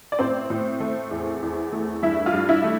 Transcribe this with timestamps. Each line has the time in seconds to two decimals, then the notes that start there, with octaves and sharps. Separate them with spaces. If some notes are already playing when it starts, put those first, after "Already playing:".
0.12 D5
0.19 A2 C4 C5
0.50 A2
0.80 A3
1.11 E2
1.42 E2
1.72 A3
2.03 G2 E4 E5
2.26 F4 F5
2.33 G2
2.49 E4 E5
2.64 A3